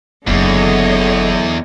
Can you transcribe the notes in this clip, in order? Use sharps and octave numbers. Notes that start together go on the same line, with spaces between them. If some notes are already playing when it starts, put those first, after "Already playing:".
F#1 E2 D3 F#3 D4 G#4 C#5 D#5